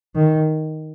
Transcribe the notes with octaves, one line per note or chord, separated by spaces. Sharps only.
D#3